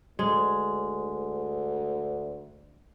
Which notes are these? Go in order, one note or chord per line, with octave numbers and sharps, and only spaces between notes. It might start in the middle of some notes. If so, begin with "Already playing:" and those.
D2 G#3